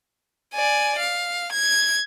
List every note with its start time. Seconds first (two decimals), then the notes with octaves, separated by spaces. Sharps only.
0.54 D5 G#5
0.99 F5
1.52 G#6